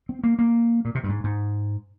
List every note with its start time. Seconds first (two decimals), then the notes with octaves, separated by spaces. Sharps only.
0.09 C4
0.24 A#3
0.39 A#3
0.85 A#2
0.95 C3
1.04 G2
1.09 G#2
1.24 G#2